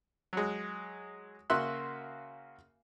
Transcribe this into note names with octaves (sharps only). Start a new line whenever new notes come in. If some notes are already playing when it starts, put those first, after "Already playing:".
F#3 G#3
C#3 A#3 F#4 E5 C6 F#6